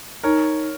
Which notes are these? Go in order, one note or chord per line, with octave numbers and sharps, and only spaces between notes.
D#4 A#4 C#5